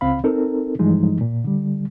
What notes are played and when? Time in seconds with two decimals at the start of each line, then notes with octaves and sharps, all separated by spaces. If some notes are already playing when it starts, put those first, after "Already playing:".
0.01 C#2 C4 F5 B5
0.24 C4 D#4 A4 A#4
0.79 G2 E3 F3 G3 G#3 D#4
1.21 A#2
1.44 D3 G3